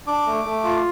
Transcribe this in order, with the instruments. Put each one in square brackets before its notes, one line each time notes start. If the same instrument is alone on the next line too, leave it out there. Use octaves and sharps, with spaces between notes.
[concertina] D4 D6
A3
A3
F4